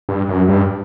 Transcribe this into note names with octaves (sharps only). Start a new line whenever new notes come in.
G2
F#2
G2